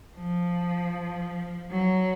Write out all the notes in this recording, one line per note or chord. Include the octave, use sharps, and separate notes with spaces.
F3
F#3